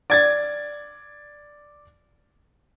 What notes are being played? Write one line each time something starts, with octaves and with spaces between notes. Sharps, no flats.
D5 G#6 A6